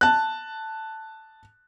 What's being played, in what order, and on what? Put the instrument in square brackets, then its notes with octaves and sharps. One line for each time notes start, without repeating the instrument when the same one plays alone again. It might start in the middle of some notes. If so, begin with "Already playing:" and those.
[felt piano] A5 F#6